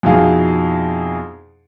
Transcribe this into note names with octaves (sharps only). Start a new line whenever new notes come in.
F2 B2 D#4 E4 G#4 F5